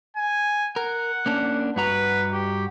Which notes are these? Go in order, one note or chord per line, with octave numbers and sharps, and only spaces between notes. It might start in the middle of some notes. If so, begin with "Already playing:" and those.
G#5
A#4 F#5
A#3 C#4 D4
G2 F#4 B4 A#5
G4